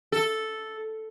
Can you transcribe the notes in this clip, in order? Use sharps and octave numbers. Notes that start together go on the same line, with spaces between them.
A4